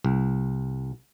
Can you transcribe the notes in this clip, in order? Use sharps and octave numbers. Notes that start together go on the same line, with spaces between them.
C2